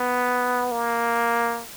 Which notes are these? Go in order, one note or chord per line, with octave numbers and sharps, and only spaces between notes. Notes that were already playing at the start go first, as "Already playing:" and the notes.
Already playing: B3
A#3